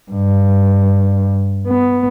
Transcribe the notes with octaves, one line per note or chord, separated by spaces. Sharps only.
G2
B3